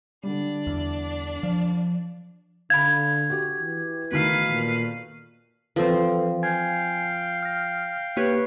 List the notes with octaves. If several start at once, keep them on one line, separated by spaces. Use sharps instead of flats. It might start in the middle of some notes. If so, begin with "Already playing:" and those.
D3 G3 D4
E2
F3
D3 F5 B5 G#6
F#4 G4
E3
B2 D#3 A3 B4 F5
A#2
E3 F3 C4 A4 B4
F5 G5 G#5 G#6
F6 A#6
A#3 G4 B4 C#5